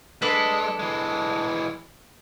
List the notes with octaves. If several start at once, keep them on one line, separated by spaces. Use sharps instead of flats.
G#3 D4 A4 B4
E3 G#3